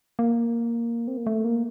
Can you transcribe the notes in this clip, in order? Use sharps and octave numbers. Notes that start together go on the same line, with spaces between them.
A#3
C4
A#3
A3
A#3